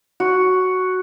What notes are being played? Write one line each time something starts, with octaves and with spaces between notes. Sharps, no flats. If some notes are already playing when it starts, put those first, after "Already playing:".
F#4